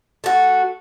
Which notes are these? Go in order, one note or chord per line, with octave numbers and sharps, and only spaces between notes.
A3 F#4